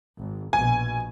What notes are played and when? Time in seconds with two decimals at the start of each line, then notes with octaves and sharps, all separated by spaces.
0.18 G#1
0.53 A#1 B2 G#5